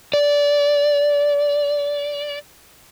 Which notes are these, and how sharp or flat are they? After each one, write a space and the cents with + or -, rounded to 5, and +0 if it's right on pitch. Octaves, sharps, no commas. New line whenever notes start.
D5 -20